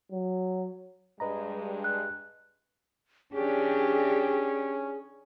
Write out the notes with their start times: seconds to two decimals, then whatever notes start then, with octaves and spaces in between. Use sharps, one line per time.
0.12 F#3
1.20 G2 G#3 B4 D#5 A#5
1.84 F#6
3.33 E3 C#4 D4 G4 G#4